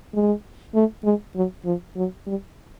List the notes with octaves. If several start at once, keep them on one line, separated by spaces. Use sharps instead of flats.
G#3
A3
G#3
F#3
F3
F#3
G3